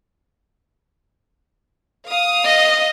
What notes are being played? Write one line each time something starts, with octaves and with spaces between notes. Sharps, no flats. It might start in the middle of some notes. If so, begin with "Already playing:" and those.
F5 D#6
D#5